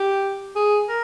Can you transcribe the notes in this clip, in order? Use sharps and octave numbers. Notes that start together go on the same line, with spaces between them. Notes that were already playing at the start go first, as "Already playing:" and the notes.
Already playing: G4
G#4
A#4